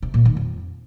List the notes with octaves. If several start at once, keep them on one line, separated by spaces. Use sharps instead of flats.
C3
A#2
D#3
F2